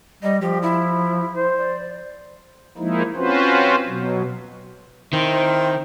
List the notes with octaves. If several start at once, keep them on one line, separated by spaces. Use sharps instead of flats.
G3 D#5
F3 G4
E4
C5
D5
F3 G#3 A#3 D#4 E4
C4 C#4 F4 F#4 B4 C5
B2 F#3
D#3 C4 E4 C5